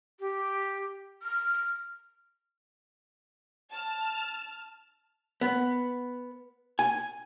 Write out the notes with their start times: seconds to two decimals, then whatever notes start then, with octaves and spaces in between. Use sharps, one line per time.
0.20 G4
1.22 F6
3.71 A5 F6
5.41 B3
6.79 G#5